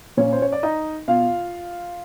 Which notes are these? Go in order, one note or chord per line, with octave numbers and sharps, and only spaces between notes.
A#2 C#4 C#5
C5
C#5
D5
D#4 D#5
B2 F4 F5